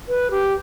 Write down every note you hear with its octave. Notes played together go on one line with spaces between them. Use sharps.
B4
G4